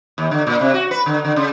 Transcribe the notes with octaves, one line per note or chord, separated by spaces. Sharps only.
D#2
D3
A#2
C3
F#4
B4
D3
D3
C#3